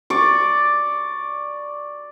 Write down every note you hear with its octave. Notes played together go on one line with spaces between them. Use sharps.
D5 C#6